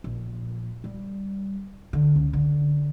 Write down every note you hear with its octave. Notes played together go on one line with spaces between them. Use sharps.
A#1
G3
D3
C#2
D3